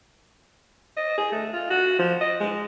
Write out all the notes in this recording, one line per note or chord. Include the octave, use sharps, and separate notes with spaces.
D#5
G#4
A3
F4
F#4
F3
D#5
G#3